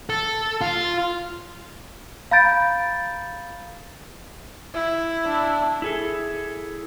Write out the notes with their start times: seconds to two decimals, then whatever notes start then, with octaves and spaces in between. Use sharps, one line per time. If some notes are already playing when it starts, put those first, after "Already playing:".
0.10 A4
0.61 F4
2.31 F5 A#5 B5 G6 A6 D7
4.74 E4
5.25 D4
5.82 E4 G#4 A4